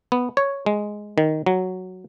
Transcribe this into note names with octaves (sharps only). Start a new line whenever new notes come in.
B3
C#5
G#3
D#3
F#3